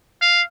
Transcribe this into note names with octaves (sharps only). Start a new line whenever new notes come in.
F5